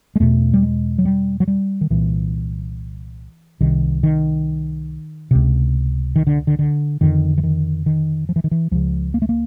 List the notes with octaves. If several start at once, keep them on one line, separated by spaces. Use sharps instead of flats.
G#3
E2 B2 A3
G3
G#3
F#3
G3
F#3
G3
D#3
C2 A#2 E3
C2 C3 D#3
D#3
C#2 C3
D#3
D3
D3
D3
F2 D3 D#3
E3
D#3
D#3
F3
E3
D#3
E3
C#2 C#3 F3
A#3
A3
A#3